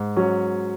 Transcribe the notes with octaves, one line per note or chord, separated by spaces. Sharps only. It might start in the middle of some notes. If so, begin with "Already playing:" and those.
Already playing: G#2
F#3 C#4